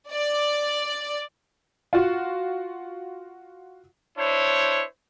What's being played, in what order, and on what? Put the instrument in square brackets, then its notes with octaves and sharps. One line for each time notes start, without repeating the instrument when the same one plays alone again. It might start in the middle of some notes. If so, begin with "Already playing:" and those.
[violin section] D5
[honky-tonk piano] F4 F#4
[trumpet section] D4 E4 C5 C#5